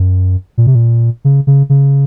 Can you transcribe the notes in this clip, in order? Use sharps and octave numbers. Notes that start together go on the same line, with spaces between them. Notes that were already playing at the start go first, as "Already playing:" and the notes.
Already playing: F#2
A#2
C3
A#2
C#3
C#3
C#3